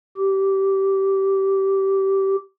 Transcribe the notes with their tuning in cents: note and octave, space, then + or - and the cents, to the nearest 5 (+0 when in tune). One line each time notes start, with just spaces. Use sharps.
G4 -15